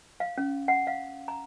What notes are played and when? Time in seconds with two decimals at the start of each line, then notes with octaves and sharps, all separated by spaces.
0.20 F5
0.38 C#4
0.68 F#5
0.87 F5
1.28 A#5